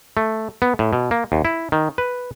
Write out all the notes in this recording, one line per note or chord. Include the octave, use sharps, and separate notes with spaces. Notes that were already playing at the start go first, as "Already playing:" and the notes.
A3
B3
A2
B2
A#3
D#2
E4
D#3
B4